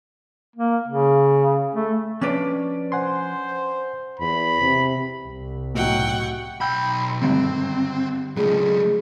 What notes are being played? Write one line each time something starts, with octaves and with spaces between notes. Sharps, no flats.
A#3
C#3
A3
F3 C#4 D4 B4 D5
C5 F#5 G#5 C6
E2 B5
C3
C2
B1 A2 F#3 F#5 G5 C#6
B1 G5 B5 E6 G6
G#1 G2 D3 C4
C#2 F#3 A3 G#4